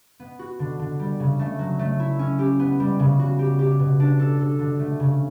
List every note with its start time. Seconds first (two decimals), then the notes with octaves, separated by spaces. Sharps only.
0.20 B3
0.39 F#4
0.59 D3
0.79 D3
0.99 G3
1.20 C#3
1.39 A3
1.59 F#3
1.79 A3
2.00 E4
2.19 C#4
2.39 G4
2.59 B3
2.80 G3
2.99 C#3
3.19 F#4
3.39 G4
3.59 G4
3.79 B2
4.00 D4
4.19 A4
4.39 A4
4.59 D3
4.79 A3
5.00 C#3